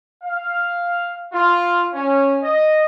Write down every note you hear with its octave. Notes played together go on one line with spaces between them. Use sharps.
F5
F4
C#4
D#5